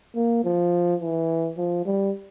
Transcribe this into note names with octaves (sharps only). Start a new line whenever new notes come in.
A#3
F3
E3
F3
G3